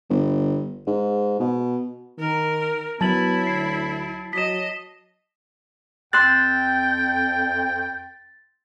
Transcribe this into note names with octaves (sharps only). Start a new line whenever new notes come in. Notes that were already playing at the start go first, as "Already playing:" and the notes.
G1
G#2
B2
D#3 A#4
F#3 B3 E4 A5 A6 F#7
D2 C7
F#3 D#5 B6 E7
F2 G5 C6 E6 F#6 A6